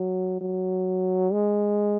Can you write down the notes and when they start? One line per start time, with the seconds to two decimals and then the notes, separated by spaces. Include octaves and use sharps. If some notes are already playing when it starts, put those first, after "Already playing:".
Already playing: F#3
0.41 F#3
1.32 G#3